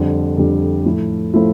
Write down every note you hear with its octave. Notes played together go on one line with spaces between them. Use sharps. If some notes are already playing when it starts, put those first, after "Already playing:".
Already playing: F2 D3 G3
F2 D3 G3
A2 F3 A3 E4
A2 F3 A3 E4